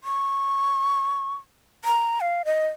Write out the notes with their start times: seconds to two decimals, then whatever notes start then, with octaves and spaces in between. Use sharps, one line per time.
0.04 C#6
1.85 A#5
2.21 F5
2.45 D#5